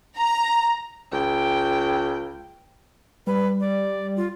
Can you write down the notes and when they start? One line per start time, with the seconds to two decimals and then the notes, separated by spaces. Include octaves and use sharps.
0.17 A#5
1.13 C#2 G5
3.27 G3 B4
3.60 D5
4.17 F4